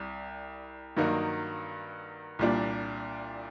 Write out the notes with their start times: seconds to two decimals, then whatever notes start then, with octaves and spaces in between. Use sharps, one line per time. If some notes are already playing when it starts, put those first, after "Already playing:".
Already playing: C2 G3
0.97 G2 D#3 F#3 A#3 D#4
2.39 C2 A#2 G3 D4